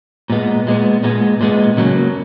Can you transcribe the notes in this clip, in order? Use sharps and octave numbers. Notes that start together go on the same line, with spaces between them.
A#2 G#3 B3
A#2 G#3 B3
A#2 G#3 B3
A#2 G#3 B3
C#3 F#3 A#3